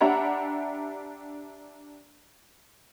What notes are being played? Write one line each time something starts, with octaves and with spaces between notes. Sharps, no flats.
D4 G4 E5 F#5 A#5 B5